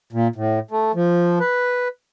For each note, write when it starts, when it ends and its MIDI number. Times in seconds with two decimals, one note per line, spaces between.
0.13 0.28 46
0.36 0.59 45
0.71 0.92 57
0.95 1.39 53
1.40 1.88 71